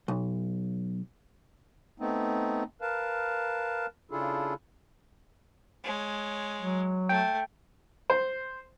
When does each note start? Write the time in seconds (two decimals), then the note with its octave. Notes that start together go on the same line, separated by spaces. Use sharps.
0.08 B1
2.00 A3 B3 C4 D#4
2.81 A#4 B4 F5 A5
4.11 C#3 D4 E4 F4 G#4 A4
5.84 G#3 C#5
6.61 F#3
7.09 A3 G5
8.10 C5